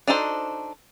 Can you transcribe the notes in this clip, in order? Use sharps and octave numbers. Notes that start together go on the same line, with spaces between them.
D4 D#4 F#4 A4 C5